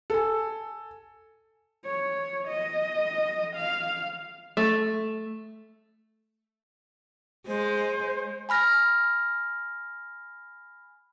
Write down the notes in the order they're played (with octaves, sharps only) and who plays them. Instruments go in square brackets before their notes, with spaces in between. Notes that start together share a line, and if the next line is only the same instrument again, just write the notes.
[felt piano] A4 G#5
[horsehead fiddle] C#5
D#5
F5
[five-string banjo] A3
[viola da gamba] G#3 [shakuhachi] C5
[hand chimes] G#5 B5 F6 A#6